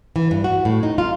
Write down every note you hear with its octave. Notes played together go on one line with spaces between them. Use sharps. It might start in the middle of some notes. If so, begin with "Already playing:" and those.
E3
G2
F#4
A2
D#4
F4